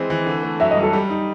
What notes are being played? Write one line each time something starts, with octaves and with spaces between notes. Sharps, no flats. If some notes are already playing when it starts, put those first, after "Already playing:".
Already playing: E3 G#3 C4
E3
D3
A3
F#3 E5
D#5
G2
A4
G3
D#4